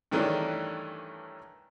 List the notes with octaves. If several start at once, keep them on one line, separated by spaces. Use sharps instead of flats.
G2 D#3 E3 A3 C#4 D4